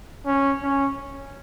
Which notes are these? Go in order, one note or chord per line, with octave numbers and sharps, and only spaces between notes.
C#4
C#4